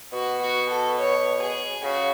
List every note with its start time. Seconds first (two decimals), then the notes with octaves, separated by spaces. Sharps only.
0.12 B2 F#4
0.42 F#4
0.69 A4
0.98 C#5
1.41 G#4
1.84 C#3 F#4